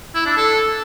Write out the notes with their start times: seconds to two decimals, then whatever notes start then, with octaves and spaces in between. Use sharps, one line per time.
0.15 E4
0.26 D4
0.37 A4